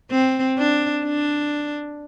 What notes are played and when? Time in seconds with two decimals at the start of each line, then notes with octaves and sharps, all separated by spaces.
0.11 C4
0.58 D4
1.05 D4